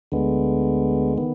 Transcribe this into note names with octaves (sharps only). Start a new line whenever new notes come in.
D2 D3 G#3 B3
D#3 B3